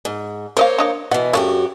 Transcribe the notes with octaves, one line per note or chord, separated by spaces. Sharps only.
G#2
A#3 A#4 C5 C#5 D#5 F5
D4 D#5 F5
B2 E3 F#5
F#2 C#3 A3 D4 F#4 G4